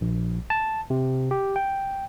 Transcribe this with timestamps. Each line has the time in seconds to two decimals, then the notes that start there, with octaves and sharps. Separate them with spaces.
0.01 A#1
0.50 A5
0.90 C3
1.31 G4
1.56 G5